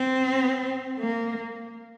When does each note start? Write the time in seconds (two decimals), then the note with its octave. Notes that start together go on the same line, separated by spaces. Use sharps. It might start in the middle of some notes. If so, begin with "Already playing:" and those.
Already playing: C4
0.99 A#3